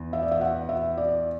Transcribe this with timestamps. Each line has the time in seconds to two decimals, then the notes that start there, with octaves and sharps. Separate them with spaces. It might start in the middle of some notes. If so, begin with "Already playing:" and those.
Already playing: E2
0.13 E5
0.22 D5
0.31 E5
0.41 F#5
0.69 E5
0.98 D5